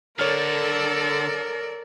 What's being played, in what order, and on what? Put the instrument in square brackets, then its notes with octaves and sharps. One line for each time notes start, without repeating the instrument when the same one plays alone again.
[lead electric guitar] D3 [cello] A4 D5 [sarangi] A#4 [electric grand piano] C#5 F6